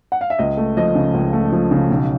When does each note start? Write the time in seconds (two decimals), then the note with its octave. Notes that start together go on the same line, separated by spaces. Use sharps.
0.12 F#5
0.21 F5
0.30 E5
0.39 C#2 D#5
0.57 A3
0.77 F3 D#5
0.95 C#3
1.14 C#2
1.33 A3
1.52 F3
1.71 C#3
1.90 B1